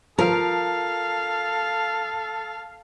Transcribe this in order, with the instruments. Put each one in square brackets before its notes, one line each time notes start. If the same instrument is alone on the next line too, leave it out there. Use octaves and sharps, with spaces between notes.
[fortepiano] F3 [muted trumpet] A4 [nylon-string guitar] A#4 [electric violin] F5